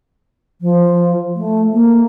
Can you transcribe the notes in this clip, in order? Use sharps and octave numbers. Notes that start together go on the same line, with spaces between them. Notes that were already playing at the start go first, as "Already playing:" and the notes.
F3
A3
A#3